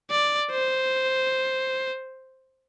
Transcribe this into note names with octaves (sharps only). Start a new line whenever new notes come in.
D5
C5